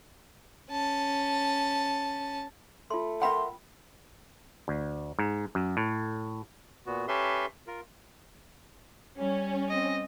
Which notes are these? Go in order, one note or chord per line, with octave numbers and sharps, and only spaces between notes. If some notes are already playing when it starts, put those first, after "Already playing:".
C#4 A5
A3 F4 C6
A#4 E5 F#5 G5 B5 C6
D2
G#2
F#2
A2
A#2 B3 F#4
C#4 G4 A4 B4 E5 C6
F4 A#4
G3 C#4
C4 D#5